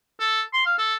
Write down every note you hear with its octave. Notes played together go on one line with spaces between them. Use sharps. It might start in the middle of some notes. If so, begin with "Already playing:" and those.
A4
C6
F5
A4